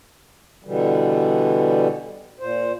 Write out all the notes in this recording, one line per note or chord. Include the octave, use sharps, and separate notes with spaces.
B2 D3 E3 G3
A#2 C5